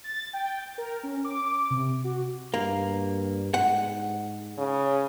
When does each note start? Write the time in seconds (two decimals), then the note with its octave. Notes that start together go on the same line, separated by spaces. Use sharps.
0.04 A6
0.33 G5
0.78 A#4
1.03 C#4
1.25 D6
1.70 C3
2.04 F#4
2.54 G2 A#3
3.54 G#2 F#5
4.58 C#3